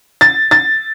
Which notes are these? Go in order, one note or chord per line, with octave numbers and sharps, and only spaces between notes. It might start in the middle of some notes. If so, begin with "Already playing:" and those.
A6
A6